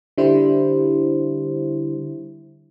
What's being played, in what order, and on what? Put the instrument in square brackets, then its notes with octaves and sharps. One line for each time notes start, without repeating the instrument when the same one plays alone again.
[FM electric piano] D3 G3 E4 C5